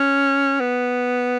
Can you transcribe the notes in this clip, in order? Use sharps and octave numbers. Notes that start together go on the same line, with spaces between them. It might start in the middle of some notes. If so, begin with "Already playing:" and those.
Already playing: C#4
B3